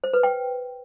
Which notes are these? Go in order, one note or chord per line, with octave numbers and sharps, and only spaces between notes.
C5
B4
G5